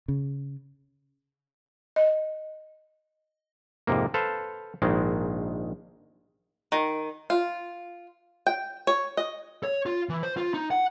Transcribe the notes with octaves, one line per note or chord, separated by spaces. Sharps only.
C#3
D#5
F2 G#2 C3 A#3
A4 B4 C5 F5
A#1 G#2 D#3 G#3
D#3
F4
G5
C#5
D#5
C#5
F4
E3
C5
F4
D#4
F#5